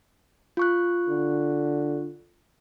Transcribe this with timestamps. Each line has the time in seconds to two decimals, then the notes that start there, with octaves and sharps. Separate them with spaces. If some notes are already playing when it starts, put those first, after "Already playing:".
0.57 F4 C#6 F#6
1.09 D3